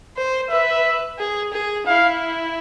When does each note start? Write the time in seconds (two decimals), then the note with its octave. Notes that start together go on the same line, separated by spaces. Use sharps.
0.17 C5
0.50 B4 E5
1.19 G#4
1.53 G#4
1.87 E4 F5